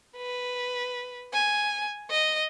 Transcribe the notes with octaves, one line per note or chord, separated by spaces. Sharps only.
B4
G#5
D#5